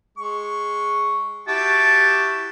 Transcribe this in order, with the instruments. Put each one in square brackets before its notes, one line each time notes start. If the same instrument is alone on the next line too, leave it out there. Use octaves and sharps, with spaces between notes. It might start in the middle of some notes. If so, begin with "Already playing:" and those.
[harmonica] G#3 C#6
[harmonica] E4 F#4 G4 [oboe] A5